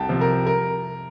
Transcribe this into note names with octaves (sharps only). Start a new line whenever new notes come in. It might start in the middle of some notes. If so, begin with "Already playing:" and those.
Already playing: C2 G5 A5
C3 F3
A#4
A#4